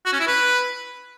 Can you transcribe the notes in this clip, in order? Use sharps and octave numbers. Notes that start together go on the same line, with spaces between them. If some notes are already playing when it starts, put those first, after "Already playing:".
F#4
C#4
E4
B4